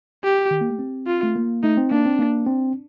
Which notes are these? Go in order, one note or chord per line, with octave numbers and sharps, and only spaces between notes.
G4
D#3
A#3
A3
C4
F4
A3
A#3
A3 D#4
C4
A#3 D4
C4
A#3
C4